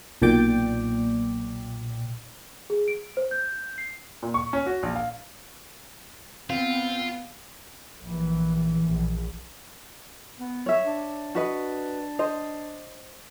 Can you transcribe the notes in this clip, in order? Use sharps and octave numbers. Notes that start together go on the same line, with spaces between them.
B1 A#2 D5 G5 D6
G#4
D7
C5
G6
C7
A#2
C#6
C#4
F#4
A#1
F5
B3 C4 F4 F5
A#1 E3
A#1
B3
C#5 E5
D4
F#4 B4 D#5
C5 D#5